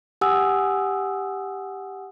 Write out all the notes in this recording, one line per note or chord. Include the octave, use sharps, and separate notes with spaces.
G4 F#5 G#5 D#6 E6